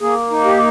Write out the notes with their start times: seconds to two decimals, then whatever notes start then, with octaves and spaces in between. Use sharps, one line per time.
0.01 A#3 G#4
0.31 D#4
0.45 G4